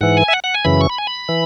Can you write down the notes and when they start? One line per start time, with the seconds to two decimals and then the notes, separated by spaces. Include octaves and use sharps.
0.01 G#2 E3 F#5
0.17 G#5
0.28 E5
0.33 F#5
0.44 F#5
0.54 G#5
0.65 F#2 C#3 E3 B5
0.81 C#6
0.89 B5
0.98 G#5
1.07 B5
1.29 E3